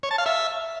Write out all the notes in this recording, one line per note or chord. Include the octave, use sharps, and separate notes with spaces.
C#5
A5
F5
E5